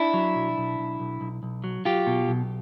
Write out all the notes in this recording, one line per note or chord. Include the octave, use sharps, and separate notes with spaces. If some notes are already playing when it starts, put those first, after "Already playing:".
Already playing: D4 E4
F#3
B1
B1
B1
B1
B1
B1
F#3
F#3 F4 G4
B2
B1